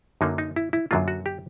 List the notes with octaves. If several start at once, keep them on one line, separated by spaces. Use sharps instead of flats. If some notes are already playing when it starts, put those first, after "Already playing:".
F#2 D3 F#3 A#3 D#4
D#4
E4
E4
F#2 D3 F#3 A#3 F4
F#4
G4